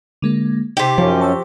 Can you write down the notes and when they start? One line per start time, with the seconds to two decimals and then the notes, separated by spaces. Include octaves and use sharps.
0.22 D3 G#3 A#3
0.77 C3 D#4 G4
0.98 F#2 F3 C#4
1.21 A5 C#6 E6